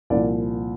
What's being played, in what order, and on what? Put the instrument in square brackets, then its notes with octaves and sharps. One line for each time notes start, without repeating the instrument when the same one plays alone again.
[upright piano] C2 A#2 F3 D5